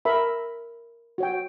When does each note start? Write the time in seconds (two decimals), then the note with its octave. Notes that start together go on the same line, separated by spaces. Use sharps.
0.05 A#4 E5 B5
1.18 F#4 C#5 G5